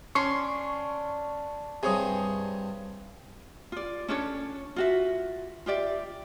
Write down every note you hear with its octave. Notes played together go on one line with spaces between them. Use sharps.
C#4 D4 C6 C#6
G2 C3 G#4 C#5 D#6
F4 D5
C#4 D4 A4 C#5
F4 F#4 E5
F4 G4 D5 E5